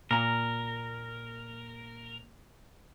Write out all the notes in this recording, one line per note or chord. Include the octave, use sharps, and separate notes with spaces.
A#2 A#4 A#5